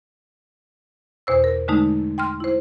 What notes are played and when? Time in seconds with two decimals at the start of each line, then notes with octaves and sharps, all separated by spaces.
1.27 E2 B2 C5 E6
1.44 A#4
1.68 D3 G#3 A3 D#4
2.18 G5 C6 F6
2.40 E4 C5